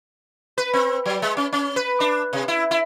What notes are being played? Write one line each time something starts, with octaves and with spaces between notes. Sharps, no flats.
B4
C4
F#3
G#3
C#4
C#4
B4
D4
C3
E4
E4